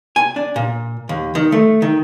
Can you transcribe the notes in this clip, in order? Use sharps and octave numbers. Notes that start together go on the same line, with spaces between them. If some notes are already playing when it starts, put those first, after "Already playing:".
G#5
D4
A#2
D#2
D#3
A3
D#3